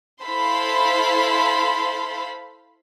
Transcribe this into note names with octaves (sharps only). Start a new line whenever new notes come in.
E4 A4 C5 F5 B5 C6